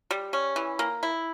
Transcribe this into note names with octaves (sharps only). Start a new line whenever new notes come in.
G3
C#4
E3
A#3
E4